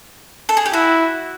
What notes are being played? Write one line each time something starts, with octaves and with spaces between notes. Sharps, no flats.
A4
G#4
G4
E4 F#4